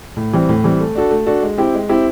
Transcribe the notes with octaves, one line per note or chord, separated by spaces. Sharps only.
A2
E3 G3 C4
A2
E3 G3 C4
A3
D4 F#4 A4
A3
D4 F#4 A4
G#3
C4 E4 G4
G#3
C4 E4 G4